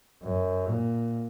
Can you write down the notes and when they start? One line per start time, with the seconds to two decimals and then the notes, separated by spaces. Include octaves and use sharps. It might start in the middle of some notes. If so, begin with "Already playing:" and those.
0.23 F#2
0.68 A#2